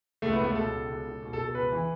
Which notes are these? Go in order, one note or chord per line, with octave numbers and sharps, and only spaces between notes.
C#2 A3
B3
C#2
A3
B2 A4
B2
C#2
C#2
B2
A4
B2
A4
C#2 B4
E3